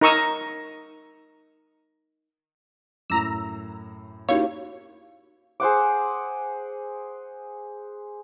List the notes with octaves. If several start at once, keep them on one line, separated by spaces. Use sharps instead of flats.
D#4 A#4 A#5 C#6 D#6 E6
F#2 A2 A#5 D6 E6
A#3 C#4 D#4 E4 F#4 G4 C#5 F5
G#4 C5 F#5 D6